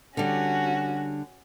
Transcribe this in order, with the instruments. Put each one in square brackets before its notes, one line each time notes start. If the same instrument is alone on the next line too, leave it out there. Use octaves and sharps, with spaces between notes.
[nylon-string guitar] D3 G3 [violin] C#4 F#4